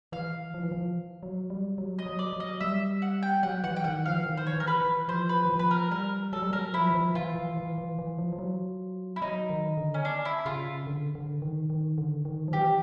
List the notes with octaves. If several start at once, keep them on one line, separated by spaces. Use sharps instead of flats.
E3 F5
F3
E3
F3
F#3
G3
F#3
D#5
F#3
D5
F#3
D#5
G3 E5
F#5
G5
F#3 F#5
E3 F#5
G5
D#3 F#5
F3 F5
E3
D#3
C5
C#5
E3
A#4
B4
E3
F3 C5
B4
E3
F3
B4
A#4
G3 A#4
F#3 A4
G3
F#3 A#4
F3 E4
E3
F3
E3 F4
E3
E3
E3
E3
F3
F3
F#3
E4
F#3 D#4
D#3
D3
C#4
D4
E4
C#3 F4
D3
D3
D#3
D#3
D3
D#3
F3
E3 G4